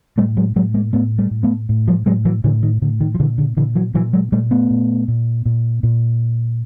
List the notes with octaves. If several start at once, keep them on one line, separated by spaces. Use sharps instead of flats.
A2 G3 A3
F#3 G#3
A2 F#3 G#3
G#3 A#3
A2 A3 B3
G3 A3
A2
A3 B3
A2
F3 G3
A2 F#3 G#3
E3 F#3
A2 D3 E3
D#3
A2 D3
D#3
F3
A#2 D3 E3
D3
A#2 D3 E3
E3 F#3
A#2 E3 F#3
F#3 G#3
A#2 G3 A3
A3 B3
A#2
A#2
A#2
A#2